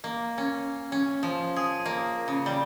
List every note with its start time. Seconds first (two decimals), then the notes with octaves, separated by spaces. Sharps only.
0.04 A#3
0.38 C#4
0.92 C#4
1.23 F3
1.56 G#4
1.86 A#3
2.28 C#3
2.46 G3